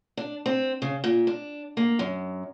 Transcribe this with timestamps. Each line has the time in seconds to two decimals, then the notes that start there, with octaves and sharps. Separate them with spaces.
0.17 D4
0.46 C4
0.82 C#3
1.04 A#2
1.27 D4
1.77 A#3
1.99 F#2